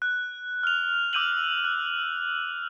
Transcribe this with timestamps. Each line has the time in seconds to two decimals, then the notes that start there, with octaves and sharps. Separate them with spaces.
0.02 F#6
0.63 F6 F7
1.13 D6 E6 G6 D#7 F7 F#7
1.64 F#6